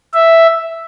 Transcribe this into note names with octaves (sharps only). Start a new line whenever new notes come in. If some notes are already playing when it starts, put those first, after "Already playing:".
E5